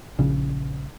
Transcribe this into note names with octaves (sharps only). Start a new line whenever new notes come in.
A#1 C#3